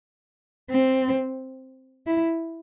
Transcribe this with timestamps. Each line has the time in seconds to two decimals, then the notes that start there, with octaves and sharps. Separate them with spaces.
0.70 C4
2.07 E4